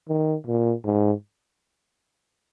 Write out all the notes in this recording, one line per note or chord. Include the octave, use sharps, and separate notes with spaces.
D#3
A#2
G#2